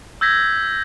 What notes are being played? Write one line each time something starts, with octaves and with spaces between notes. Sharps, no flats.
E6 G6 G#6 A#6 B6